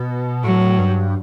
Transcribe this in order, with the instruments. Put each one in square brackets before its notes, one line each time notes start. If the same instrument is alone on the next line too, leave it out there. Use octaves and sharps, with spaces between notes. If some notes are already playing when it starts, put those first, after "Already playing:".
Already playing: [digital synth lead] B2
[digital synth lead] A2 [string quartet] F#3
[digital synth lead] G2